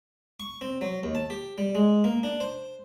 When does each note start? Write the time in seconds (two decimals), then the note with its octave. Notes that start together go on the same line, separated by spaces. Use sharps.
0.40 C#6
0.61 C4
0.81 F#3
1.03 D#2
1.15 A5
1.30 G4
1.58 G3
1.75 G#3
2.04 A#3
2.23 D4
2.40 C5